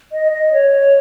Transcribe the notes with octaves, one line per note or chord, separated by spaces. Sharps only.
D#5
D#5
C#5